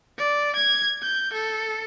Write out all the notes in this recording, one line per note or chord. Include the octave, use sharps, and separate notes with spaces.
D5
G#6
G6
A4